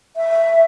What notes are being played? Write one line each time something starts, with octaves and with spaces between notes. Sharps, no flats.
E5